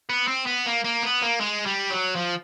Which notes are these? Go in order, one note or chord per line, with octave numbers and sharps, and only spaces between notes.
B3
C4
B3
A#3
A#3
B3
A#3
G#3
G3
F#3
F3